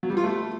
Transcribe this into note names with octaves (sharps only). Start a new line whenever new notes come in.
F#3
G3
F4
A3